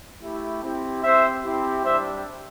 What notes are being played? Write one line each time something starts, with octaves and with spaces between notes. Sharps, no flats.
A3 E4 G4
C4 E4 G4
C4 G4 C5 E5
C4 E4 G4
G3 D4 G4 C5 E5